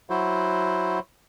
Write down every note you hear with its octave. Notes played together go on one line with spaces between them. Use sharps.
F#3 E4 F#4 C5